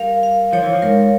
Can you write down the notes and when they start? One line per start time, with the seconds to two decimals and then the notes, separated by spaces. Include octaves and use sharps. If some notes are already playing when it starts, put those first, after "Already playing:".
Already playing: G3 A#4 F5
0.23 F5
0.53 F3 C#5
0.63 E3
0.73 F3
0.82 G#2 A#4